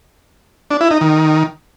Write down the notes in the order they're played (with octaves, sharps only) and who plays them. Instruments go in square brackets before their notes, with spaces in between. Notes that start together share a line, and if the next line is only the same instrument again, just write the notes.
[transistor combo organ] D4
E4
D#4
D#3